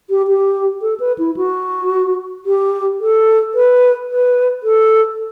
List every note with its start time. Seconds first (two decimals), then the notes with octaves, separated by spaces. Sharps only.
0.10 G4
0.28 G4
0.82 A4
1.00 B4
1.18 E4
1.37 F#4
2.46 G4
3.00 A4
3.54 B4
4.09 B4
4.63 A4